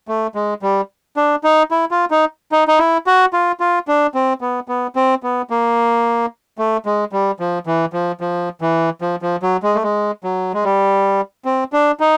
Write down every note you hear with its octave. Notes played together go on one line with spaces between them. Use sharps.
A3
G#3
G3
D4
D#4
E4
F4
D#4
D#4
D#4
E4
F#4
F4
F4
D4
C4
B3
B3
C4
B3
A#3
A3
G#3
G3
F3
E3
F3
F3
E3
F3
F3
F#3
G#3
A3
G#3
F#3
G#3
G3
C4
D4
D#4